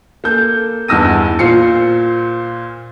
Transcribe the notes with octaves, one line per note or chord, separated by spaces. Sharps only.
A#3 A4 G6
E2 G2 D#4 E6 A#6 D#7
A#2 F4 C5 C7 C#7